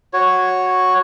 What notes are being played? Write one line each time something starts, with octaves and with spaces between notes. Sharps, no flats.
F#4 C#5